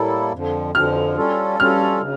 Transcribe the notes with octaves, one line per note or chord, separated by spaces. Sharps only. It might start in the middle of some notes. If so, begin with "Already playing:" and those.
Already playing: A2 G3 A#3 E4 A4
F2 D3 F3
F2 D3 F3 F6
G3 C#4 F4 A4
G3 C#4 F4 A4 F6
C#3